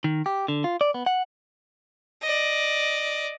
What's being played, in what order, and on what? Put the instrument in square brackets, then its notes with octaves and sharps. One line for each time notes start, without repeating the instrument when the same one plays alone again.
[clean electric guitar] D#3
G4
D3
F4
D5
B3
F#5
[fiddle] D5 D#5